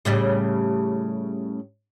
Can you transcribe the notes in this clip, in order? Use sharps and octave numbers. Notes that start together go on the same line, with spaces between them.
A2 C#3 G3